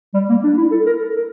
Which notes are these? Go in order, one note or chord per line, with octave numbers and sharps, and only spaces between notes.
G3
A#3
D4
E4
A4
A#4
A4
A#4